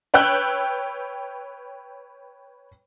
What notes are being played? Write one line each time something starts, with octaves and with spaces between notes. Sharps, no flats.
B4 C#5 G5 E6 F#6 G6